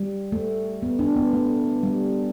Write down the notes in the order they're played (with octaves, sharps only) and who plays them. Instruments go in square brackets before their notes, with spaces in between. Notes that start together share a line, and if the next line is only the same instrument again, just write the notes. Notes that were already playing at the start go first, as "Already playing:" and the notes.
Already playing: [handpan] G3
A3
B3
D4
B3
A3
G3